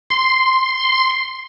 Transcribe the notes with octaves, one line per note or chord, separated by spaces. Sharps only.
C6